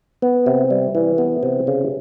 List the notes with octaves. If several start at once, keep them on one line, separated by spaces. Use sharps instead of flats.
B3
C3
G3
E3
B3
C3
C#3